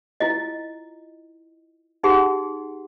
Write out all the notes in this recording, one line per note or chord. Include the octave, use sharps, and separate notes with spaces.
E4 F4 D#5
D#4 G4 G#4 F#5 C6